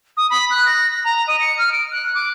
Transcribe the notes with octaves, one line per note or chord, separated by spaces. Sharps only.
D#6
B5
F#6
A#6
A#6
A#5
D#5
C#7
F6
D7
F#6
D6